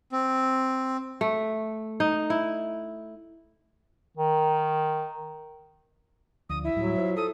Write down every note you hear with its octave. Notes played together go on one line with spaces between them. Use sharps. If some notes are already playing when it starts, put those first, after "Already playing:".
C4
A3
D#4
E4
D#3
D2 D3 F3 D#6
E4 E5
A2 F#3 G3
F4 C5
A4 D#6